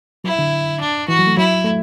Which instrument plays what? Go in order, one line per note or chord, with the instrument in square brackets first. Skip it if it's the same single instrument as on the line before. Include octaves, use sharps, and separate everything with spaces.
[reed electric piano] F#3 [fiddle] E4
[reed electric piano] D3
[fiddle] D4
[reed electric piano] E3 [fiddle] F#4
[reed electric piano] F#3
A3
[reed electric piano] F#3 [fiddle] E4
[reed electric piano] A3